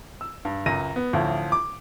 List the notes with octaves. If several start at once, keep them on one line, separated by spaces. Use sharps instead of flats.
E6
G2
C#2 F#2 A#6 D#7
B3
A1 D2 F3
D6